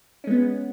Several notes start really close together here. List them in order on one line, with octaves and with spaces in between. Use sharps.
C#4 G#3 B3